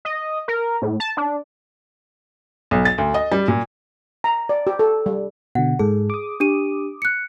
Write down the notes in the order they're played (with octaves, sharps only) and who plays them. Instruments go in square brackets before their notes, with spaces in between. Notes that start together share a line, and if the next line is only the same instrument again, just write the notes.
[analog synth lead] D#5
A#4
A2
A5
D4
[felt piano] B1
A6
D2
D#5
G3
A#2
[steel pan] A#5
D5
G4
A4
G3
[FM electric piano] B2 D3 [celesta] F#5
[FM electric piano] G#2 A4 [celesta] G#4
[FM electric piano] D6 D#6
[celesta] D4 G4 D#7
F#6 C#7